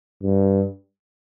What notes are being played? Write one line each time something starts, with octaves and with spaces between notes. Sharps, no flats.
G2